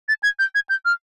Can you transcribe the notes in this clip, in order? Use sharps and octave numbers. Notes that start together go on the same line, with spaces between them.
A6
G#6
G6
G#6
G6
F6